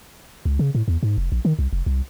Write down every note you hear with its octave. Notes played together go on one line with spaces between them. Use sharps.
C#2
C#3
A2
E2
G#2
F1
A#1
D#3
C2
F1
C2